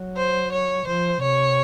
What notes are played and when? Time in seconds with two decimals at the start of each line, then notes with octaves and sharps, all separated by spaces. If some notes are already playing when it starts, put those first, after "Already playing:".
Already playing: F#3
0.16 C5
0.52 C#5
0.87 F3 C5
1.22 C3 C#5